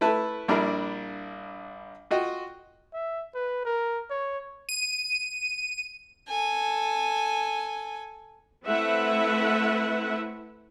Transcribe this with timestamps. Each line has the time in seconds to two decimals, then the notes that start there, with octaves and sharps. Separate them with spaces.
0.01 A3 E4 B4 A5
0.48 A#1 G3 D4 E4 A#4
2.11 F4 F#4 D#5 G5
2.94 E5
3.35 B4
3.65 A#4
4.10 C#5
4.69 D#7
6.29 A4 G#5
8.65 A3 C4 E4 B4 E5 F#5